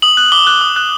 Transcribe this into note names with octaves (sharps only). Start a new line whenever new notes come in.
D#6 F#7
F#6
D6 G7
F#6
D#6
F#6